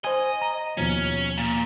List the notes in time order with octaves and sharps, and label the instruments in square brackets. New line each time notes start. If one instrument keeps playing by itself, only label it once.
[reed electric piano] C5 G#5 [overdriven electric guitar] D#5
[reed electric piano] A#5
[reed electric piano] D#2 B2 F3 [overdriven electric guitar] C#4
[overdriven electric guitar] A#2